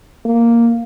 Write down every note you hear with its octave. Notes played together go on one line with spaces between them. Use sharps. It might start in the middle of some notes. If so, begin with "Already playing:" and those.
A#3